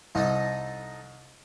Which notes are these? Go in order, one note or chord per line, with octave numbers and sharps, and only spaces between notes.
C2 D#4 A4 D#5